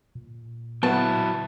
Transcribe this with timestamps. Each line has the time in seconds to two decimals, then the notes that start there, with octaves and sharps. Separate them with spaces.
0.15 A#2
0.83 F#3 B3 E4 A5